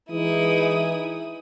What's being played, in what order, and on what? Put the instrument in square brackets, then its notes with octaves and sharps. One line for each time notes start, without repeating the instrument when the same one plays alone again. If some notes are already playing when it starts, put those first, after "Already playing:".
[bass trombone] E3 [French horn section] G#3 D#4 G#4 [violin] E4 D#6